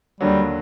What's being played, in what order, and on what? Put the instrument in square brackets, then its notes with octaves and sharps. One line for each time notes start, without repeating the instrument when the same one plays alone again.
[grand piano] D#2 D3 F#3 [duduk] G3